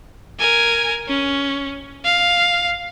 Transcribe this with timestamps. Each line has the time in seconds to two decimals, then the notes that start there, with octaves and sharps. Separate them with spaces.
0.39 A#4 G#5
1.08 C#4
2.05 F5